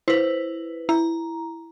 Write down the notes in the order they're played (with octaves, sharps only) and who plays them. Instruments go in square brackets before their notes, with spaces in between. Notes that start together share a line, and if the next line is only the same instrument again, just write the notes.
[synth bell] E4 B4 [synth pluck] C5
[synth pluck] E4 [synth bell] A#5